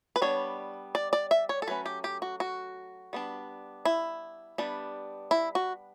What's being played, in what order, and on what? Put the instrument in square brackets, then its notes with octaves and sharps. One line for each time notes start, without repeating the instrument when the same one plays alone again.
[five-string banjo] B4
G3 B3 D4 C#5
D5
D5
E5
C#5
A4
F#3 A3 C#4 B4
G4
G4
F#4
F#4
G3 B3 D4
E4
G3 B3 D4
E4
F#4